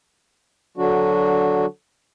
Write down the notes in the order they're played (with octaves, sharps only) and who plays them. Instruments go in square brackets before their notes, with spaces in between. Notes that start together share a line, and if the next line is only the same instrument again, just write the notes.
[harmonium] D3 F#3 D4 F#4